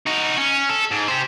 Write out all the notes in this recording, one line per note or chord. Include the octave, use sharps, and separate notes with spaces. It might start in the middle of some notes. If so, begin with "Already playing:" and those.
D#4 F#4
C#4
A4
G#2
G4 C5